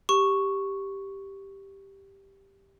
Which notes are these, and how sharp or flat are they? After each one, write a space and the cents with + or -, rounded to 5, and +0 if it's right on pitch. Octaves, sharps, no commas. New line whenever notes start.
G4 +0 C#6 +0